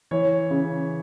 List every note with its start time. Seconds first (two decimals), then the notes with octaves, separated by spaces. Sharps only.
0.11 E3 C#5
0.51 C#3